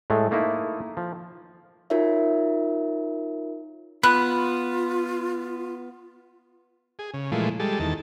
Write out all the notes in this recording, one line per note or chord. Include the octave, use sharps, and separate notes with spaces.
A2 G#3 A3
A3 A#3 D#4 E4
F3
D#4 F4 F#4 A#4 C#5 E5
B3 F4 B5 F#6
G#4
C#3
A#2 E3 F3 G#3 A3
G3 G#3 A4
E2 D#3 A5